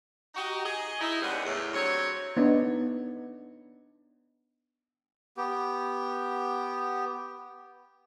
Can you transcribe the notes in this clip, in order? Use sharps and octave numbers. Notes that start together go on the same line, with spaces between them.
D#4 F#4 G4
G#4 D#5
D#4 E4
D#2 C#3 G3 G#3 B3 F#5
E2 A2
G2 F#3 C4 C#5
B3 D4 D#4
B3 G4